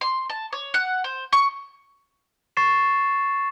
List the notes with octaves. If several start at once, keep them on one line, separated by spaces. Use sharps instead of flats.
C6
A5
C#5
F#5
C5
C#6
C#6 A6 C7 E7